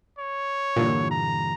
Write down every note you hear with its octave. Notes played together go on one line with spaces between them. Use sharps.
C#5
G2 A#2 D3 E3
A#5